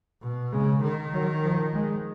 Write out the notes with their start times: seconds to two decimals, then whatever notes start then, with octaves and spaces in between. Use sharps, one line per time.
0.23 B2
0.53 C#3 G#3
0.83 D#3
1.13 F#3
1.43 F3
1.73 G#3